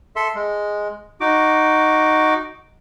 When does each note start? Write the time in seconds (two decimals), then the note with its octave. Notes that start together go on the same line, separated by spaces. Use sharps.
0.16 A4 E5 C6
0.35 G#3
1.20 D#4 F#4 D6